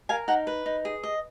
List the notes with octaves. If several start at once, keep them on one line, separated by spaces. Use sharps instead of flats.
A#4 F5 G#5
D#4 F#5 A#5
B4
D#4
G#4
D#5